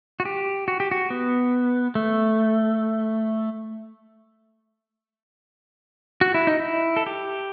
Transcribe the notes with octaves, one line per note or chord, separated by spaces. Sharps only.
F#4
G4
F#4
G4
F#4
B3
A3
F#4
E4
D#4
E4
A4
G4